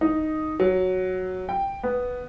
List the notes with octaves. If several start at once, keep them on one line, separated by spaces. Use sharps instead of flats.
D#4
F#3
G5
B3